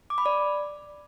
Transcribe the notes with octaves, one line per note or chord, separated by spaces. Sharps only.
D6
B5
D5